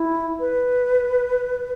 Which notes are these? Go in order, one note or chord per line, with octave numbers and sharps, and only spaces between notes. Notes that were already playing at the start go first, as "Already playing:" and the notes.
Already playing: E4
B4